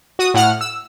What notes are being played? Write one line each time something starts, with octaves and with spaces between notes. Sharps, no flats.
F#4 D#6
A2 F#5 F6
E6